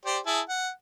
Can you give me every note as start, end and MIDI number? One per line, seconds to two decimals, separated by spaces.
0.05 0.18 67
0.05 0.18 72
0.05 0.18 74
0.26 0.41 64
0.26 0.41 68
0.26 0.41 81
0.49 0.70 78